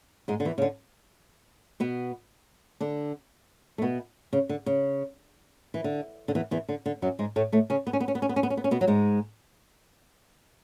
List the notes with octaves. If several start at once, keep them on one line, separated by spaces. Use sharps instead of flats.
G#2 G#3
D3
E2 E3
C#3
D3
B2 B3
D3 D4
A3
B2 B3
C#3
D3
C#3
E3
D3
D3
E2 E3
E2 E3
D3
D3
F#2 F#3
G#2 G#3
A2 A3
A2 A3
C#3 C#4
B3
C#4
B3
C#4
B3
C#4
B3
C#4
B3
C#4
B3
C#4
B2 B3
F#3
G#2 G#3